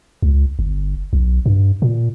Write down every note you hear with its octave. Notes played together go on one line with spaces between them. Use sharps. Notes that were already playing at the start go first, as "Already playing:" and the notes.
C#2
G1
B1
G2
A#2